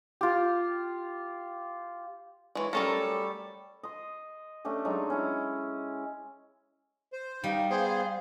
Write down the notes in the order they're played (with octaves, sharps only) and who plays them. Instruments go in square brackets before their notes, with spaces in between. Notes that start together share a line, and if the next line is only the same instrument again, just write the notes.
[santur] F4 G4
[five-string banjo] E3 G#3 [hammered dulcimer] C#5 C#6
[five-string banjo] F#3 C#4 A#4 [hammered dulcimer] G3 A3 [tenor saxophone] A4
[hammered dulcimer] D#5 C6
A3 C#4 D4 G4
F#3 G#3 D4 D#4
C#4 E4
[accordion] C5
[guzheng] G3 [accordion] D#4 [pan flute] F5
[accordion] B3 G#4 [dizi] C5